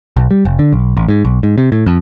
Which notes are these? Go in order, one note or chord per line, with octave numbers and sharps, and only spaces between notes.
B1
G3
F1
D3
B1
A1
G#2
B1
G#2
C3
A2
F2